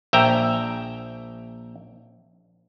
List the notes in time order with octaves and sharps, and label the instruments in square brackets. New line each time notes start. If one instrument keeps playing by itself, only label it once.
[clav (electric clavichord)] A#1 E5 G5 A#5